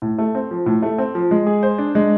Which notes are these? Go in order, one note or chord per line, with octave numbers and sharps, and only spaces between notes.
A2
A3
C4
F3
A2
A3
C4
F3
G#3
G#4
C5
D4
G#3